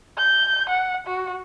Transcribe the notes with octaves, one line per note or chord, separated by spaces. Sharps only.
G6
F#5
F#4